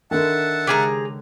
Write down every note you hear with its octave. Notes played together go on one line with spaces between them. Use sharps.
D3 D#3 E5 F#5 A5
C#3 G#3 G4 G#4 A#5